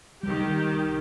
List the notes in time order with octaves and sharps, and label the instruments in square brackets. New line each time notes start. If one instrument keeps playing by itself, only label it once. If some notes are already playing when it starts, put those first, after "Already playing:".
[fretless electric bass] C2 G3 [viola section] D#3 G4